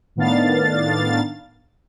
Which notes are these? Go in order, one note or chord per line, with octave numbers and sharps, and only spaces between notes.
A2 D#3 B3 D4 F5 A6